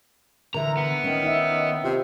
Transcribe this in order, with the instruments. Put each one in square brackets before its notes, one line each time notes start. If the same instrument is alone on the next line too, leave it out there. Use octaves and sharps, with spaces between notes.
[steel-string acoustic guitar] D3 E3 [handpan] A#4 E5 [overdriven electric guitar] A#5
[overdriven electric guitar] B3
[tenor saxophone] D#3 [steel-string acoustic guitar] C#4
[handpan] D#4 E5
[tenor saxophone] C3 [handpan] F4